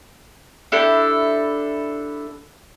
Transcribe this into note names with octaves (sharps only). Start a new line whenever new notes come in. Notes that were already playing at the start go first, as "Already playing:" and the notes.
D4 E4 G4 A4